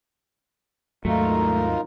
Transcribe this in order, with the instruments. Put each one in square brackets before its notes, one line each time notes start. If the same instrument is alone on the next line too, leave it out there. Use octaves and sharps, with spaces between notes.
[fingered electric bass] D#2 G#2 F#3 [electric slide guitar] A3 [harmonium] D#4 F4 A#4